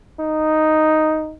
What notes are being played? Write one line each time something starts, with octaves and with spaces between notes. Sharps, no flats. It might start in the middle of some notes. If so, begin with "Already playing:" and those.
D#4